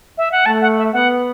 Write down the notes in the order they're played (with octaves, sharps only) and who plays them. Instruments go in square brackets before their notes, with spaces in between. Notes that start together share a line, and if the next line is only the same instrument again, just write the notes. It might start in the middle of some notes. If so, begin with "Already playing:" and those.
[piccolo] E5
F#5
[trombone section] A3 [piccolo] A5
[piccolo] F#5
E5
[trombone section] B3 [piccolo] F#5